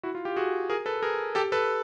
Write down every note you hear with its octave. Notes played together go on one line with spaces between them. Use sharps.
E4 F#4
F4
F4 G4
F#4 G#4
G#4 A#4
A4 B4
G#4 A#4
G4 A4
A4 B4